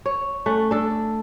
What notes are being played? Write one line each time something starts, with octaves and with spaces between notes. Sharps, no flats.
C#5
A3 C#4 F#5
D4 A4